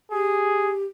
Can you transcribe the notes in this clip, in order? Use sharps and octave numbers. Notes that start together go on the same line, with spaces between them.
G4 G#4